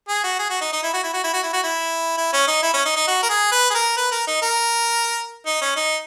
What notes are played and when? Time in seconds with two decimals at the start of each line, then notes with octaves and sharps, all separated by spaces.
0.09 G#4
0.24 F#4
0.39 G#4
0.50 F#4
0.61 D#4
0.73 D#4
0.83 E4
0.94 F#4
1.03 E4
1.13 F#4
1.24 E4
1.33 F#4
1.43 E4
1.53 F#4
1.63 E4
2.18 E4
2.33 C#4
2.48 D#4
2.63 E4
2.74 C#4
2.85 D#4
2.96 D#4
3.08 F#4
3.23 A#4
3.29 G#4
3.52 B4
3.70 G#4
3.75 A#4
3.97 B4
4.12 A#4
4.27 D#4
4.42 A#4
5.46 D#4
5.61 C#4
5.76 D#4